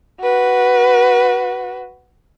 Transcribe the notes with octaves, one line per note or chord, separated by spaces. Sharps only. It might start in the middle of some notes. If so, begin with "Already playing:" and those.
F#4 B4